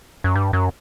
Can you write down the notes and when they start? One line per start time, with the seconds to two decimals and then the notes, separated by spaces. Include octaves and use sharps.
0.24 F#2
0.36 G2
0.53 F#2